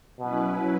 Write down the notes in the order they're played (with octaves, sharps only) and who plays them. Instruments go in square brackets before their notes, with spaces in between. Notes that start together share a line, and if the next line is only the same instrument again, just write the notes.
[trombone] B2 [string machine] F#3 C#4 E4 B4